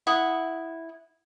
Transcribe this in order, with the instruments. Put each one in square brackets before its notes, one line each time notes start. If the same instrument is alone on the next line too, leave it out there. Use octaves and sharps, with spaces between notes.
[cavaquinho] E4 F#5 D#6